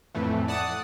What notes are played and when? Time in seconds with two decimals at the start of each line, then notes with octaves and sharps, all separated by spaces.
0.15 F2 A2 E3 A3
0.48 D5 F#5 A5 D#6